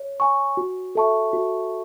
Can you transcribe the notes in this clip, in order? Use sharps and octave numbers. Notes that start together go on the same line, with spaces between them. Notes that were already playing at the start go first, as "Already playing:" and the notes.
Already playing: C#5
G#5 C#6
F#4
A4 E5 A5 C#6
F#4